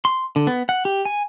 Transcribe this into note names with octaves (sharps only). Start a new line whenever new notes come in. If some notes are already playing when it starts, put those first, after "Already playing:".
C6
D3
B3
F#5
G4
G#5